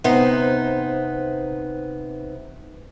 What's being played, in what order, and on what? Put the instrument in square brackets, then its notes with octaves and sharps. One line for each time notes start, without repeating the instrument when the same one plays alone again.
[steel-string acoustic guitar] C3 B3 D#4 C5